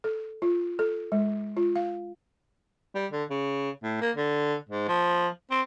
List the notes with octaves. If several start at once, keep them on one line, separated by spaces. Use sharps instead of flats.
A4
F4
A4
G#3
F4
F5
G3
D3
C#3
A2
A#3
D3
G#2
F3
C4